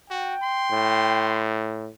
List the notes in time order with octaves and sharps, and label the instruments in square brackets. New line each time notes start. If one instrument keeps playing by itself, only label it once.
[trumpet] F#4 [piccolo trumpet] G5
[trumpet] C6
[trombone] A2